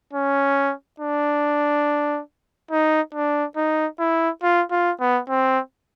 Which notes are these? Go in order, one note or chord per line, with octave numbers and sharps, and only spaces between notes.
C#4
D4
D#4
D4
D#4
E4
F4
F4
B3
C4